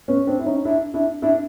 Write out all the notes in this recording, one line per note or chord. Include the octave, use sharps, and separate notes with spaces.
B3 C#4
C4 D4
E4
C#4 D#4
D4 E4
D4 E4
D4 E4